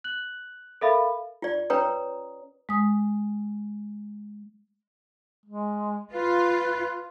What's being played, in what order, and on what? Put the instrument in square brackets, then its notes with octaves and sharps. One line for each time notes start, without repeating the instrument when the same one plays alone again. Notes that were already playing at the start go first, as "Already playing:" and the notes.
[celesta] F#6 F#7
A4 A#4 E5 F5 B5
[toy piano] F4 D5
C#4 B4 C#5 A#5 D#6
[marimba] G#3 D#6
[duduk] G#3
[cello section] F4 [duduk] B4